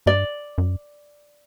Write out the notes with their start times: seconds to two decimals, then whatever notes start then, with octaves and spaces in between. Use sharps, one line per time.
0.06 G2 D5
0.58 F#2